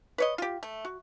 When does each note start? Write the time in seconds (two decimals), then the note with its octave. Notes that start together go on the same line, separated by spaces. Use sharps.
0.18 B4 C#5 D#5
0.38 F4 G4
0.63 A3
0.85 F#4